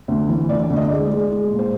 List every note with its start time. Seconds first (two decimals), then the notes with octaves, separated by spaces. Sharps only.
0.08 D2
0.29 E3
0.49 D2 D5
0.63 D5
0.70 D2
0.76 D#5
0.90 G#3 D5
1.10 G#3
1.30 G#3
1.51 A#2
1.59 C5